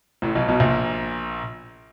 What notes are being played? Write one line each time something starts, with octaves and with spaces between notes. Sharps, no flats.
A1 A2
B1 B2
B1 B2
A#1 A#2